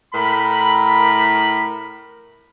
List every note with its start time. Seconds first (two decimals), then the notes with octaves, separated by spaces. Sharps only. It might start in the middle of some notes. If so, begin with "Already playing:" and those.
0.14 A2 A#4 B5